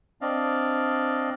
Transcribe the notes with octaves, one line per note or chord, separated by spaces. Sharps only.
C4 D4 D5 D#5 F5